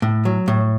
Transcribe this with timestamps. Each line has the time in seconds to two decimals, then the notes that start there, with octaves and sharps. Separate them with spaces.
0.02 A2
0.25 F#3
0.48 A2